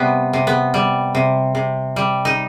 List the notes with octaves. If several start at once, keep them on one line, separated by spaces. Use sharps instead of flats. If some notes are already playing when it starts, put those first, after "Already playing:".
Already playing: C3 G3 B3
C3
B3
G3
C3
C3
G3
D#4